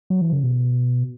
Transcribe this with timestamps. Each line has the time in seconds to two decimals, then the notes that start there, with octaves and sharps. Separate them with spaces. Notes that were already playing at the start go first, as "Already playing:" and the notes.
0.10 F#3
0.21 E3
0.33 C#3
0.43 B2